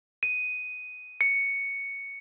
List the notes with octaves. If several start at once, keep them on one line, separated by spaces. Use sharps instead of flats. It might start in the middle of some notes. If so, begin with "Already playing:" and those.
D#7
C#7